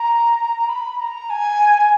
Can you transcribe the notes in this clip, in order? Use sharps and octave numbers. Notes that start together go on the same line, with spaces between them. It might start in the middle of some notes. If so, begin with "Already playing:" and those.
Already playing: A#5
B5
A#5
G#5